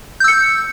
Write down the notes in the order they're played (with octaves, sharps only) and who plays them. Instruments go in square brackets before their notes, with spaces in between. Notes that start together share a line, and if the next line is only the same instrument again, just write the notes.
[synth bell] G6
E6
C#7